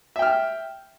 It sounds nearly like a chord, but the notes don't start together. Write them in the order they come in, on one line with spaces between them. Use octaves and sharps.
E5 G5 F6